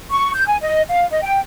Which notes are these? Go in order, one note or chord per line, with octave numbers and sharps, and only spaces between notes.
C#6
G6
G#5
D#5
F5
D#5
G5